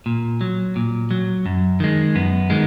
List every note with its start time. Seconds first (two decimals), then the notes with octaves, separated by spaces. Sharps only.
0.06 A#2
0.41 F#3
0.76 A#2
1.11 F#3
1.46 F#2
1.80 D#3 G#3
2.15 F#2 B3
2.50 D#3 G#3